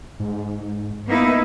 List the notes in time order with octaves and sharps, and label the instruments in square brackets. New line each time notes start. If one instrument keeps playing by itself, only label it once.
[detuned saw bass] G#2
[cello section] A#3 D#4 E4 [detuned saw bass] B3